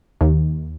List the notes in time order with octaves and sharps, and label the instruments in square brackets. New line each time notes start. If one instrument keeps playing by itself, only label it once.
[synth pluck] D#2